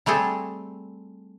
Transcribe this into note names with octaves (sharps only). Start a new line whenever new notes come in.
G3 A3 C4 G#4 A4